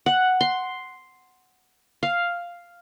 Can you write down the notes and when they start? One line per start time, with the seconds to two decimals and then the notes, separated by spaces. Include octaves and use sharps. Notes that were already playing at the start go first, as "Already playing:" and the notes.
0.06 F#5
0.41 C6
2.03 F5